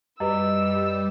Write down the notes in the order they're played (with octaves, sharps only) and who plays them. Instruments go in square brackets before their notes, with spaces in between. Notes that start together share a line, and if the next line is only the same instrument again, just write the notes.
[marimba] F#2 [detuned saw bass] G3 [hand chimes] G4 B4 D#5 [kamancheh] E6